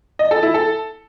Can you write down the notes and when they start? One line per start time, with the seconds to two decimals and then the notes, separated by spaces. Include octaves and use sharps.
0.19 D#5
0.31 A4
0.43 E4
0.54 A4